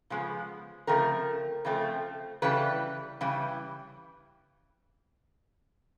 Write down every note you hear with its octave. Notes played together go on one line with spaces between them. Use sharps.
C#3 F3 G#3 B3
C#3 F3 A3 C4 A#4
C#3 F3 A3 C4
C#3 E3 G3 B4
C#3 E3 G3